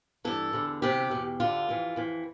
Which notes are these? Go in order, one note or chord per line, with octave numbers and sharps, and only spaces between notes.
G2 E3 A4
E2 D3
D2 C3 E3 G4
E2 B2
D2 D3 F4
F2 E3
F2 E3